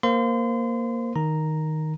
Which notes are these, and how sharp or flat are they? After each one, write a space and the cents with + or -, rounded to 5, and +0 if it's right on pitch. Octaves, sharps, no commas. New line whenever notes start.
A#3 +0 C5 +0 C6 -35
D#3 +0 A#5 +0